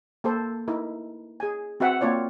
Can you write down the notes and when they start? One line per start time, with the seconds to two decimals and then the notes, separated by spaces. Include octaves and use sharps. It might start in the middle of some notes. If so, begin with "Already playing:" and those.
0.24 A#3 A4 C5
0.68 D#4 E4 A#4
1.40 G#4 G#5
1.80 C4 F#4 E5 F#5 G5
2.01 A#3 C4 F4 C#5 D5